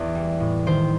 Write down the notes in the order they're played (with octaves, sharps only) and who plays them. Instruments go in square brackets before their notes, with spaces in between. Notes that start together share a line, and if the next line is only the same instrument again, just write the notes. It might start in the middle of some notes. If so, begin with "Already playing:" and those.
Already playing: [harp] E2 D5
G3
A2
D#3 C5